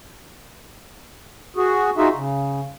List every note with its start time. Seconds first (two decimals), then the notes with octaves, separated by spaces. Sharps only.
1.57 F#4 G#4
1.97 D#4 F4 F#4 G#4 E5
2.15 C#3